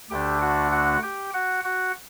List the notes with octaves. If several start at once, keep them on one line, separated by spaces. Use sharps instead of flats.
D2 D3 A3 D4 G4 G5
F#4 F#5
F#4 F#5
G4 G5
F#4 F#5
F#4 F#5